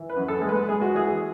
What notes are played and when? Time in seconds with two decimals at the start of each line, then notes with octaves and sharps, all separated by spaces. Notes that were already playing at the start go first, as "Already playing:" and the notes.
Already playing: E3
0.09 B4
0.16 F#2
0.28 A4
0.41 G#3
0.49 B4
0.68 G#3 G#4
0.82 F#4
0.94 E3 G#4